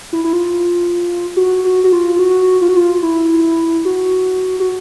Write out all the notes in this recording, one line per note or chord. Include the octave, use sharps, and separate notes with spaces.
E4
E4
F4
F#4
F#4
F#4
F4
F#4
F4
F#4
F4
E4
F#4
F#4